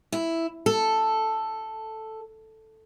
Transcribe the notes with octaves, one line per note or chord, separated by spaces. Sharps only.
E4
A4